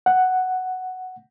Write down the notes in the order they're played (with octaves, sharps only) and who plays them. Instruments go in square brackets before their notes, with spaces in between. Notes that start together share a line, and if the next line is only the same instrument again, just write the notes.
[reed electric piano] F#5